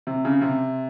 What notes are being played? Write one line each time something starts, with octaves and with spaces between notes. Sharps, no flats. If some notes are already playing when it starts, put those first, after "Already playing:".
C3
C#3
C3